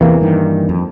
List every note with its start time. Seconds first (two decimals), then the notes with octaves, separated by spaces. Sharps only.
0.01 E2 C3 E3 A#3
0.21 G2 D#3
0.69 F2